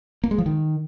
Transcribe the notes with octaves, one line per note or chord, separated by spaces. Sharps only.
A#3
G#3
F3
D#3